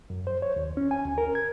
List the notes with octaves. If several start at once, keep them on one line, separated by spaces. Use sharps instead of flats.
F#2
C5
C#5
D#2
C#4
G#5
D2
A#4
G#6